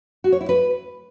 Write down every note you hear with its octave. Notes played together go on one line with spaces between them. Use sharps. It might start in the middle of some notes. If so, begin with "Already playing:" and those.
F#4
C#5
E4
B4